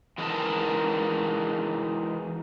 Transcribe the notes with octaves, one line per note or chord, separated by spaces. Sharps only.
E3 G#3 C#4 D#4 A#4 A5